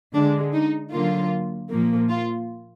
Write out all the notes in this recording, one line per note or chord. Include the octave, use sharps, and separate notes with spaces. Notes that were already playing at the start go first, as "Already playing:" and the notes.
D3 G#3 D4
D#4
D3 F#3 A#3 F4
A#2 F3 A#3
F4